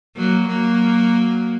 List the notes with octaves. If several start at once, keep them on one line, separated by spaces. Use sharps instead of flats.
F#3 A#3
F#3 A#3